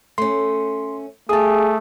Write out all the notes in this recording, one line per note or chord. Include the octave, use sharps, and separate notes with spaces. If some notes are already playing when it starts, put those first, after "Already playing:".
A3 C#4 C6
C#3 A3 G4 G#4 A5 D#6